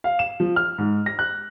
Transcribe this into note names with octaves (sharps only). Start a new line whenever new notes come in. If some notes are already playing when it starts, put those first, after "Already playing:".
F5
E7
F3
F6
G#2
A#6
F#6